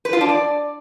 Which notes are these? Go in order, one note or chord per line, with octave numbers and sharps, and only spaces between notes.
B4
F4
D4
D5